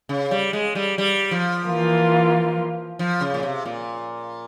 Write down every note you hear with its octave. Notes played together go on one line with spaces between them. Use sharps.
C#3
G3
G#3
G3
G3
F3
E3 A#3 F4
F3
C#3
A#2
C3
A#2